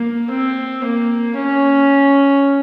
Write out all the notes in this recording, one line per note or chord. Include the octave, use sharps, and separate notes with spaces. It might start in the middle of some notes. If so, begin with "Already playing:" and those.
Already playing: A#3
C4
A#3
C#4